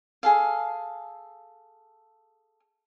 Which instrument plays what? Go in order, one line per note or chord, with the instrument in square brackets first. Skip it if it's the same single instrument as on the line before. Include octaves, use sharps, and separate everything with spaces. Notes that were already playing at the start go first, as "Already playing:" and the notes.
[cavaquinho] G#4 A4 F5